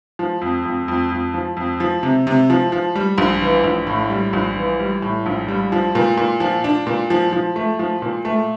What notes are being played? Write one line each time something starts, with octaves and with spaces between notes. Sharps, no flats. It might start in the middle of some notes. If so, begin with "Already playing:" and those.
F3
F2
F2
F2
F2
F3
F2
F3
C3
C3
F3
F3
G3
A#1
E3
A#1
A2
G3
A#1
E3
G3
A2
A#1
G3
F3
A#2
A#2
F3
D4
A#2
F3
F3
A3
F3
A#2
A3